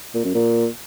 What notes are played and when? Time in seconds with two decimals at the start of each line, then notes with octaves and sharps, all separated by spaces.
0.14 A#2
0.24 F#2
0.34 A#2